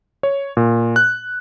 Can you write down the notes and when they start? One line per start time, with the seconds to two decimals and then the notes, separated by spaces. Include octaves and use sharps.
0.23 C#5
0.57 A#2
0.96 F#6